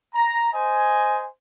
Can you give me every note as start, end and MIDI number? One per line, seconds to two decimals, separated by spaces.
0.15 0.52 82
0.53 1.27 72
0.53 1.27 75
0.53 1.27 80